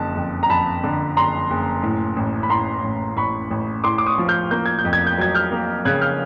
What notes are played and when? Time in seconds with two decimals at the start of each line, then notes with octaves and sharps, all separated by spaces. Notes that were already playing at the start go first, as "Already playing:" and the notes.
Already playing: F#1 F2 D3 A5
0.16 F2
0.43 A#5
0.49 F2 A5 B5
0.84 D3
1.17 F#1 A#5 C6
1.51 F#1
1.83 A2
2.16 A1
2.43 B5
2.50 A2 A#5 C6
2.84 A1
3.17 A1 B5 C#6
3.51 A1
3.84 A2 C6 D6
3.98 D6
4.06 C#6 D#6
4.18 F3
4.28 F6 G6
4.51 A#3 G6
4.66 G#6
4.79 G6
4.85 F2
4.93 G#6
5.07 G6
5.18 F#3 G#6
5.35 F6 G6
5.52 A#3
5.85 C#3 F#6 G#6
6.01 F6 G6